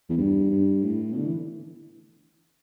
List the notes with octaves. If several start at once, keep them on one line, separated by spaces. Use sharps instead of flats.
E2
G2
G2
A2
B2
D3
E3